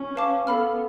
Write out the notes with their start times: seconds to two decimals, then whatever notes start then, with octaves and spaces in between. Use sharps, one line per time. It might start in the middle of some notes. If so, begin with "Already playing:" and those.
Already playing: C#4
0.16 B4 F5 A5 D6
0.47 B3 A4 F5 B5 F6